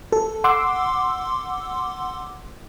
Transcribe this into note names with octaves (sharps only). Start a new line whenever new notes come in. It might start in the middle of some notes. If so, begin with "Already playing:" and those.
A4
F#5 C6 D6 E6